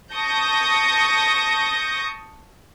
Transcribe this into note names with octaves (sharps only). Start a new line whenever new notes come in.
A5 C#6 D#6 G6 A#6